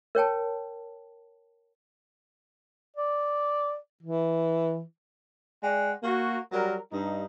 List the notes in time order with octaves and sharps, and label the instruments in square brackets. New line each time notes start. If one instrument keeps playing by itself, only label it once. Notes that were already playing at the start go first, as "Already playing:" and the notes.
[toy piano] A#4 C#5 G5 A5
[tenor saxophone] D5
E3
[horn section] G#3 D5 F#5 G5
A#3 F#4
F#3 G3 A#4
G2 D#4